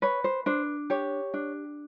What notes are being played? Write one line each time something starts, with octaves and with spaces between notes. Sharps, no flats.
B4 C#5
C5
D4 C5
G4 C#5
D4